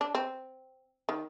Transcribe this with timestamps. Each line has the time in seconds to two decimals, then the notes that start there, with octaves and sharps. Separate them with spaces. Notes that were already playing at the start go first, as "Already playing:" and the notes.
0.01 D4
0.15 C4
1.09 D#3